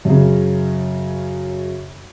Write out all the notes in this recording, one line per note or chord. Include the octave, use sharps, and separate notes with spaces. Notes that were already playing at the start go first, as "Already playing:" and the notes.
F#2 C#3